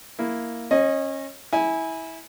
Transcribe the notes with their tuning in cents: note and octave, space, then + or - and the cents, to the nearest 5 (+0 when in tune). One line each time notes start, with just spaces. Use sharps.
A#3 +0 E4 +0
C#4 -25 D#5 +0
E4 -20 G#5 +0